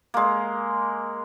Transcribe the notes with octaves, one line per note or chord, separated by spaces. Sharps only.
G#3 A#3